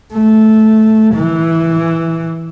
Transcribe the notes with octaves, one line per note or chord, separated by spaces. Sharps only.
A3
E3